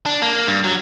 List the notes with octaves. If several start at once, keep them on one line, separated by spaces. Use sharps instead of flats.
D4
A#3
G2
F#3